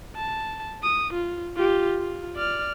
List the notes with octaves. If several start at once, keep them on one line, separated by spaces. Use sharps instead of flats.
A5
D#6
F4
F4 G4
F4
D5 F6